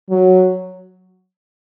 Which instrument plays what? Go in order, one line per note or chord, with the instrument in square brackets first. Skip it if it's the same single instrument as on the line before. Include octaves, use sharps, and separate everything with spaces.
[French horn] F#3